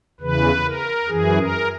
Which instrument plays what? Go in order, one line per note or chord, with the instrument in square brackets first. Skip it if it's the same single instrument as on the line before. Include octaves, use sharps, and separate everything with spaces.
[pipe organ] E2 C#3 E3 B4
A#4
F#2 E3 G#4
A#4